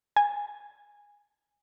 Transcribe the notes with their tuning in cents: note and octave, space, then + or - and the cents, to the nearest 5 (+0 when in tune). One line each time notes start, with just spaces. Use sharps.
G#5 -15